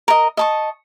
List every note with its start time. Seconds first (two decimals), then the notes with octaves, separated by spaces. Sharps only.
0.08 A#4 D#5
0.37 D#5 A5 C#6